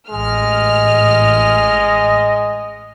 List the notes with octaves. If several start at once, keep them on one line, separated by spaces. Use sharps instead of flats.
A1 G#3 D#5 F6